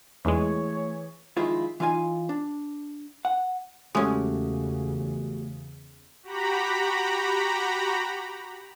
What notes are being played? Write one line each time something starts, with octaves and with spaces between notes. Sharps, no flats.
E2 E3 G#3 A3 E4 G#4 C#5
D#3 F3 G#3 E4 F4
E3 D#4 F4 F5 G#5
D4
F#5
E2 C#3 G#3 A3 C#4 F#4 G4
F#4 G4 A#5 B5